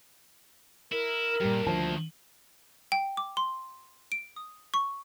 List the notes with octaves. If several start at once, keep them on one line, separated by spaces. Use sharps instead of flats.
E4 A#4
G2 A#2 G3
D2 D#3 F3 A#3 A5
G5
D6
C6
D7
D#6
C#6